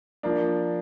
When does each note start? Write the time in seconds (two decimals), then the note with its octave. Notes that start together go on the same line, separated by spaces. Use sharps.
0.23 F3 A#3 D4